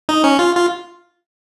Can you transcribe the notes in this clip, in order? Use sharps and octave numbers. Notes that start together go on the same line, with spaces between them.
D#4
C#4
F4
F4